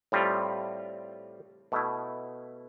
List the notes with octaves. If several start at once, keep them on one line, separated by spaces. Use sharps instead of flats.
A2 G3 C4 F4
B2 A3 E4